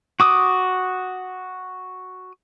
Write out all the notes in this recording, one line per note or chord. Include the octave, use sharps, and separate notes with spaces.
F#4 D6 D#6